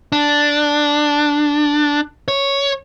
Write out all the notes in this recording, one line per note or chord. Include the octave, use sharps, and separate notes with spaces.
D4
C#5